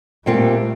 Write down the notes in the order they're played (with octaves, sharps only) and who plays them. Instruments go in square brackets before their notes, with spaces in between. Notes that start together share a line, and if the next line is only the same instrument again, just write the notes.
[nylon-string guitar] A#2 G3 C4 F4 [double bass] A3